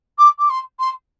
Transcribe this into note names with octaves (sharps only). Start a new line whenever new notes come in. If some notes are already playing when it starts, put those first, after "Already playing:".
D6
D6
C6
C6